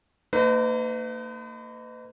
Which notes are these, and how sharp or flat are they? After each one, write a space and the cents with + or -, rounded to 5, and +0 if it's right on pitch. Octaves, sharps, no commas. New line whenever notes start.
A#3 -40 D#4 -5 B4 +40